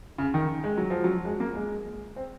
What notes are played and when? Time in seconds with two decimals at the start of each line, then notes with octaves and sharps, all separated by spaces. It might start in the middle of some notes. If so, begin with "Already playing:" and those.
0.18 C#3
0.34 D#3
0.64 G#3
0.77 F#3
0.90 F3
1.04 F#3
1.25 G#3
1.40 A#3
1.55 G#3
2.16 C4